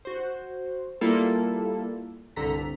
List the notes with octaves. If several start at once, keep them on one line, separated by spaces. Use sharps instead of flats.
F#4 C5
G3 A#3 E4 F4 A4
C2 G2 D3 A4 A#5 B6